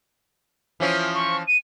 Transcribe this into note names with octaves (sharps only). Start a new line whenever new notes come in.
E3 F3 C#4
C#6
D#7